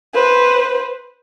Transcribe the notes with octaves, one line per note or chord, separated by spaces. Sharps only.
B4 C5